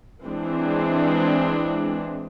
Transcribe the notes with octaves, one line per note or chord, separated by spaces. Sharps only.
E3 G#3 C4 D4